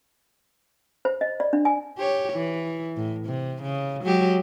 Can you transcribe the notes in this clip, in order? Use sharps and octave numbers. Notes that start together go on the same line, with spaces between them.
C5
D#5
D5
D4
G#5
G4 C#5
E3
A2
C3
C#3
F#3 G#3 G4